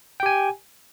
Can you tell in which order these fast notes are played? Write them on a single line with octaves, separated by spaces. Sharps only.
G5 G4 G#5